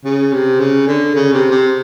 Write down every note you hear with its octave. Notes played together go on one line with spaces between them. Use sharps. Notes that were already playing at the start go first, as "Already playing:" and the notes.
C#3
C3
C#3
D3
C#3
C3
C3